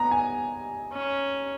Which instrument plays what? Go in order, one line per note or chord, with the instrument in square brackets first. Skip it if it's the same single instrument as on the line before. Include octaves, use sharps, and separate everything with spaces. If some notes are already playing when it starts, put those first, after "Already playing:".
Already playing: [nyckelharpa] B3 [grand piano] A#5
[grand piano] G#5
[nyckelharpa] C#4